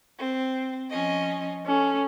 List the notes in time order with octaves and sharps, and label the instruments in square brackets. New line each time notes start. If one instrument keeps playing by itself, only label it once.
[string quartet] C4
F3 C#4 D#5
[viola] C#4 [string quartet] A4